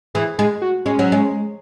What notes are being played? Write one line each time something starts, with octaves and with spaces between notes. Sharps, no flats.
E3 G#4
G#3 G#4
F#4
G#3 C#4
F#3
G#3